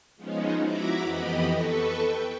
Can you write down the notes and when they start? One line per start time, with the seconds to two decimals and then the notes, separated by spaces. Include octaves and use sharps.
0.16 F3 G#3 B3 C#4 D#4
0.62 E4 F#4 E5 A#5 B5 D6
1.02 F2 E3 B3 G4 D#5 B5
1.50 A4 B4 C#6
1.99 G5